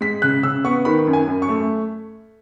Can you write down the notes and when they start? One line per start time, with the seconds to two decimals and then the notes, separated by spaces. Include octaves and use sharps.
0.01 G#3 B6
0.22 C#3 F#6
0.43 C#3 E6
0.64 B3 C#6
0.85 D#3 B5
1.07 F#2
1.13 G#5
1.28 F#2
1.42 C#6
1.49 A3